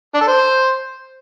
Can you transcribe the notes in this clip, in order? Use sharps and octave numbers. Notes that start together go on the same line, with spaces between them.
D4
A4
C5